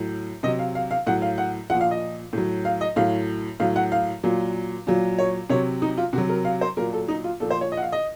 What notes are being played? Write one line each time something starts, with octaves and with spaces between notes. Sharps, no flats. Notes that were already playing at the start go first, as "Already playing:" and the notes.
Already playing: A2 F#3
C3 F#3 D#5
F5
F5
F5
A2 F#3 F#5
F5
F#5
A#2 F3 F#5
F5
D#5
A2 F#3
F5
D#5
A2 F#3 F5
A2 F#3 F5
F#5
F5
A#2 F#3
A#2 F#3
C#5
C3 F#3 C#5
D#4
F4
C3 F#3 F#4
A#4
F5
C5
A#2 F#3 A#4
A4
D#4
F4
A#2 F3 A4
C5
C#5
D#5
F#5
F5
D#5